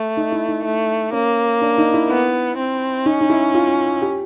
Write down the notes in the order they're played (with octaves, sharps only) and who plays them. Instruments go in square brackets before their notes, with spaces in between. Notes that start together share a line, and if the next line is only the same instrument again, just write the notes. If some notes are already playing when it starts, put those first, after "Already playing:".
Already playing: [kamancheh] A3
[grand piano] D#4
E4
D#4
[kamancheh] A3
[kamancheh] A#3 [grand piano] C#4
[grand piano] D4
D#4
E4
[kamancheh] B3
C4
[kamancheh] C#4 [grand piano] D#4
[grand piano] D#4
E4
F4
G4